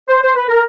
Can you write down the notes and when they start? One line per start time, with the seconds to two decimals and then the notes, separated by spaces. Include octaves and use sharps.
0.09 C5
0.22 C5
0.35 B4
0.48 A#4